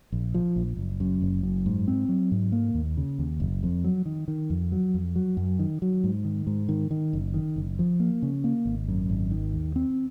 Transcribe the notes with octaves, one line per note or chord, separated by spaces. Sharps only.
A#1
F3
A#1
F#1
F#2
F#1
F#2
G#2
C4
F#3
G#2
A#3
D#2
C#3
D#2
F#1
F2
F#3
D#3
D#3
F2
F#3
F2
F#3
F#2
D#3
F#3
G#2
D#3
G#2
D#3
D#3
F#1
D#3
F#1
F3
A#3
C#3
A#3
G#1
F#2
G#1
D#3
D#2
C4